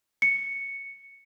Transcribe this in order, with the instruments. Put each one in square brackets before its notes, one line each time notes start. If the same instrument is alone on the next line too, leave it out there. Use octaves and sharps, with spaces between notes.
[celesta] C#7